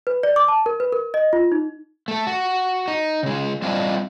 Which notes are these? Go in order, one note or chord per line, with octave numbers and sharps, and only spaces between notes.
B4
D5
D6
A5
A#4
B4
A#4
D#5
F4
D#4
A3 A4
F#4
D#4
C#3 G#3
G3 C4 D4 E4 F4 D#5